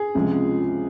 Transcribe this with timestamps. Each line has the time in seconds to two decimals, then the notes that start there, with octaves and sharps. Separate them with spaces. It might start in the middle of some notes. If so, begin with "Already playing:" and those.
Already playing: G#4
0.15 C#2 C3 F3 G#3